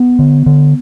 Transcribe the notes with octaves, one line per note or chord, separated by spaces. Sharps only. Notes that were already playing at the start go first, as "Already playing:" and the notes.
Already playing: B3
D3
D3